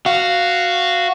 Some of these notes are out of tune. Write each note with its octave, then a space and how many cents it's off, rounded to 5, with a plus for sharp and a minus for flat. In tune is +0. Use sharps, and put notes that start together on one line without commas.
F#4 +0 F5 -10